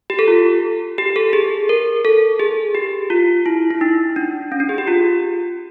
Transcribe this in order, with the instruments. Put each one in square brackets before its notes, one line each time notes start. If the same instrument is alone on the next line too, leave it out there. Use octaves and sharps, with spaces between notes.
[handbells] G4
A4
F4
G4
A4
G#4
A#4
A4
G#4
G4
F4
E4
E4
D#4
D4
C#4
D4
G#4
G4
F4